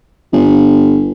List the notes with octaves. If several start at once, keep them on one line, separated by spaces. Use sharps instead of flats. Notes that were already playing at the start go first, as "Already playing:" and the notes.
G1